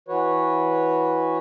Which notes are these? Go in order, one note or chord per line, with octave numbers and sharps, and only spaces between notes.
E3 F#4 B4 C#5